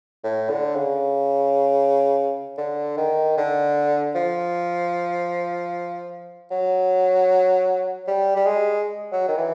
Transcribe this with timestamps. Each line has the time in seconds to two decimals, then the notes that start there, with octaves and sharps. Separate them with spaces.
0.24 A2
0.50 D3
0.76 C#3
2.58 D3
2.97 D#3
3.37 D3
4.15 F3
6.51 F#3
8.08 G3
8.36 G3
8.46 G#3
9.12 F#3
9.28 D#3
9.37 E3